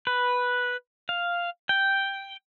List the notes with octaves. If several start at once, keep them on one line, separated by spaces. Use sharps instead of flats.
B4
F5
G5